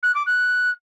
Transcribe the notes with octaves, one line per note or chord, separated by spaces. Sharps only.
F#6
D6
F#6